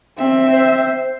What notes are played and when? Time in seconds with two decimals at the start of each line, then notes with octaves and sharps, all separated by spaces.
0.18 C4 E5
0.53 C5